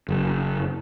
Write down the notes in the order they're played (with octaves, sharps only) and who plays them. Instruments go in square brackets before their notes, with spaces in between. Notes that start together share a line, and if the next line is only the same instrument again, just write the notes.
[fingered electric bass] F#1